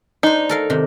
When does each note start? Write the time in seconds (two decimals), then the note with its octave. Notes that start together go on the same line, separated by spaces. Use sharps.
0.23 D4 D#4 C5
0.49 A4 A#4 F5
0.70 C3 D#3